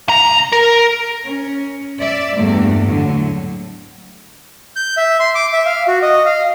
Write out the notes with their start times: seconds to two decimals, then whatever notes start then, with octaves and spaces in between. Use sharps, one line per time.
0.08 C2 A#5
0.52 A#4
1.24 C#4
2.00 D5 E5
2.36 E2 G2 A3 A#3
2.85 A2 D3 F#3
4.76 G6
4.97 E5
5.20 C6
5.35 D6
5.53 E5
5.66 F5
5.88 F#4
6.02 D#5
6.25 F5